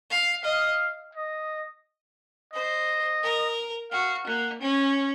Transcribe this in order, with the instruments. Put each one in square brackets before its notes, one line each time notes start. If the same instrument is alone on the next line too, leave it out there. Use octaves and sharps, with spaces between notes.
[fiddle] F5
[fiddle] D#5 [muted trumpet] F5
[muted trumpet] D#5
[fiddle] C5 [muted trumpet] D#5
[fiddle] A#4
[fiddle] F#4 [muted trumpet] F5
[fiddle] A#3 [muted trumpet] F#5
[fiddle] C#4